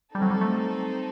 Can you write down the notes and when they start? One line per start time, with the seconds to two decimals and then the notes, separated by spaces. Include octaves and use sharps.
0.14 G3 C4 D#4 A4
0.22 F#3
0.31 G3
0.41 A3